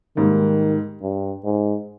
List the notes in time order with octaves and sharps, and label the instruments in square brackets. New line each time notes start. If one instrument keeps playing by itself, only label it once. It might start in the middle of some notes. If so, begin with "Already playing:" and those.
[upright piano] G#2 G3 A#3 [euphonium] D#3
[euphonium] G2
G#2